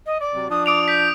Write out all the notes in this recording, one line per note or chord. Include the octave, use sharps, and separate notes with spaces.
D#5
D5
C3 F#3
F3 D4 D#6
D6 D#6 D7 F7
G6 B6